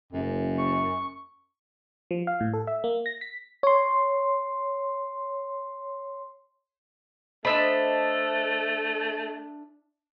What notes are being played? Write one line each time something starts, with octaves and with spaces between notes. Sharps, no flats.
F#1 F#2
C#6
F3
F5
A2
A4
E5
A#3
A#6
B6
C#5 C6
A3 D4 C5 D#5 E5 B5